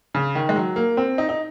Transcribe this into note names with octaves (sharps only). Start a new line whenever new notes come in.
C#3
D#3
G#3
F#3
A#3
C4
D#4
D#4